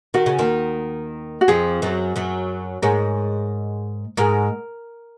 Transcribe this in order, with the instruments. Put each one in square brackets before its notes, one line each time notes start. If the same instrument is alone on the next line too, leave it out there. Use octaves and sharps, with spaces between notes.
[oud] D#3 [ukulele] F#4
[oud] C#3
D#2 D#3
[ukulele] F#4
[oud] F2 F3 [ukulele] G#4
[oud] F#2 F#3
F#2 F#3
[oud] G#2 G#3 [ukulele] A#4 C#5
[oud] G#2 G#3 [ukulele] A#4